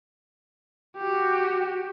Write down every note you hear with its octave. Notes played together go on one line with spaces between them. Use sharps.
F#4 G4